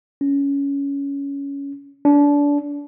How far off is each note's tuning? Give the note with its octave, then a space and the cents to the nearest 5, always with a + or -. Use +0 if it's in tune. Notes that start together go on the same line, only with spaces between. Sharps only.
C#4 +15
D4 -25